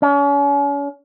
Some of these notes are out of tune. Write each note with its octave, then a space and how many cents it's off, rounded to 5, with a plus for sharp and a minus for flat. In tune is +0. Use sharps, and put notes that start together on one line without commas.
C#4 +40